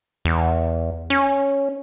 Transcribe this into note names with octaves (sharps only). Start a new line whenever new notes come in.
E2
C#4